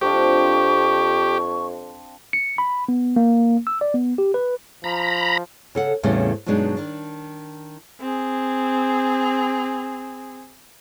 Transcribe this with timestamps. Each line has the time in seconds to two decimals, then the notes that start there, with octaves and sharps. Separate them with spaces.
0.01 F2 C4 D4 F4 G4 C#6
2.33 C#7
2.58 B5
2.89 B3
3.16 A#3
3.67 E6
3.81 D5
3.94 B3
4.18 G4
4.34 B4
4.84 F3 A#5 B5
5.75 C#3 A4 F#5
6.03 E2 A2 C#3 G3 A3 C4
6.46 G2 B2 F#3 G#3 D4 D#4
6.77 D#3 D4
8.00 C4 G#4